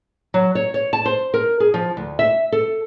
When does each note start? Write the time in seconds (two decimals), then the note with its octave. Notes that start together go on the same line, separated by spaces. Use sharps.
0.34 F#3
0.55 C#5
0.74 C#5
0.93 A5
1.06 C5
1.34 A#4
1.60 G#4
1.74 F3
1.97 D2
2.19 E5
2.52 A4